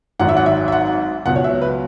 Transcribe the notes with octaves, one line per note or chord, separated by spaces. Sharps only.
G#1 G#2 F#3 F#5
E5
F#5
E5
E5
F#5
C#2 B2 F#3 F#5
C#5
E5
B4